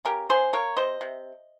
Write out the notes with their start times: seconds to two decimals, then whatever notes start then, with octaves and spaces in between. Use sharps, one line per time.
0.05 C#3 G4 A#4
0.29 C#3 G#4 C5
0.53 A#3 A#4 C#5
0.77 C3 C5 D#5
1.01 C3